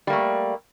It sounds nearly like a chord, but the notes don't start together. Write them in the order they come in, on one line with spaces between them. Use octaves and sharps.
G3 A#3 A3